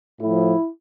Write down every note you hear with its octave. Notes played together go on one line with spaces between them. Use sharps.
A2 F3 E4